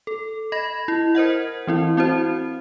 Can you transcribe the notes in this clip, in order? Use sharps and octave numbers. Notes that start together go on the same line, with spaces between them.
A4
D#5 B5 A#6
E4
A#4 C5 D#5 F#5
E3 C4 E4
C4 E4 F#4 C5